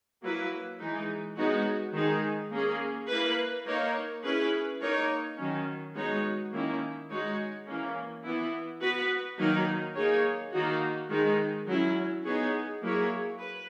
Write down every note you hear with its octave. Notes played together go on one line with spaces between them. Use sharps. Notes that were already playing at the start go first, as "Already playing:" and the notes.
F#3 A#3 E4 B4
E3 G#3 D#4
G#3 B3 D#4 F#4 C#5
D#3 G#3 D#4 G#4
A#3 C#4 G#4
A#3 E4 B4
A#3 D#4 A#4 C#5
C#4 E4 G#4 B4
A#3 D#4 A#4 C#5
D#3 F#3 C#4
G#3 B3 D#4 F#4 C#5
D#3 A#3 C#4 E4
G#3 D#4 F#4 C#5
E3 A#3 C#4
E3 B3 E4
B3 F#4 B4
D#3 F#3 A#3 D#4 A#4
A#3 D#4 G#4 C#5
D#3 A#3 D#4 F#4
D#3 G#3 D#4
F#3 C#4 E4
B3 D#4 G#4 C#5
F#3 A#3 E4 G#4 C#5
B4